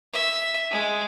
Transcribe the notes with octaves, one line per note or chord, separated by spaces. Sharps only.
E5
G#3